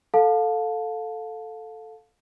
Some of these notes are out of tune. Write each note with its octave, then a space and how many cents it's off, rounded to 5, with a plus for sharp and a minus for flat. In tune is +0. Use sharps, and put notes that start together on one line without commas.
A4 +0 F5 +25 A5 +0